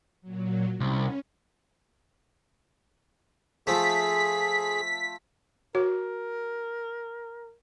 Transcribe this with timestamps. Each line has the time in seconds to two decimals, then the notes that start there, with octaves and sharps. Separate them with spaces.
0.21 A#2 F#3
0.80 C2 C#4
3.67 F3 A3 G#4 B6
5.75 F#4 A#4 C#5